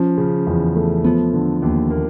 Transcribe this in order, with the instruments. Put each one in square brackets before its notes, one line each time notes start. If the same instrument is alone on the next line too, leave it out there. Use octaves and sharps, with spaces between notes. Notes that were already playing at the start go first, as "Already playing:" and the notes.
Already playing: [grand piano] F3 [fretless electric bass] C#4
[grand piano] C#3
E2
A3
[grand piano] F3 [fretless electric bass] B3
[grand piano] D3
D#2
A#3